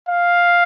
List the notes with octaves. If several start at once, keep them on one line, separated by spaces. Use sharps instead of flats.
F5